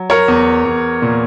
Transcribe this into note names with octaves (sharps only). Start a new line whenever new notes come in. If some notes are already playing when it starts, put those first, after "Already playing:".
Already playing: F#3
A#4 C#5
E2
E2
A#2